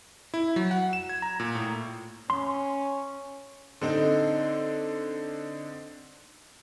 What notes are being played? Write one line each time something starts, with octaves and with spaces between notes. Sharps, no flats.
E4
F#3
F#5
E7
G#6
A#5
A#2
A2
C#4 C6
D3 C4 D#4